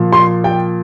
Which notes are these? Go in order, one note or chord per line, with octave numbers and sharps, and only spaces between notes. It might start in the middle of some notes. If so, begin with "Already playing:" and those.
Already playing: A#2 F3
C6
G5